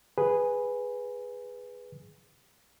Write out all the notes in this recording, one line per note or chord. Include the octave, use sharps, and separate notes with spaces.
G#4 B4